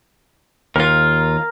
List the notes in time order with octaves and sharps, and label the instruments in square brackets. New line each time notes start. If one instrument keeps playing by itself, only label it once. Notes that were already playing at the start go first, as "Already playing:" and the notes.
[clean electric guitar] D#2 F4 [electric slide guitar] A#4